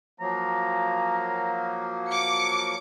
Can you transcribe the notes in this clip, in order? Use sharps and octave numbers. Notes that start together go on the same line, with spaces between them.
F3 F#3 A#3 A#5
D6 C#7